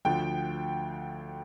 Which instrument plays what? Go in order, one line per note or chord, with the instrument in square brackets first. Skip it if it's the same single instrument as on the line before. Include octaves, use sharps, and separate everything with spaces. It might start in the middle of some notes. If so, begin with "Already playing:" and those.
[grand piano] D2 D3 F3 G5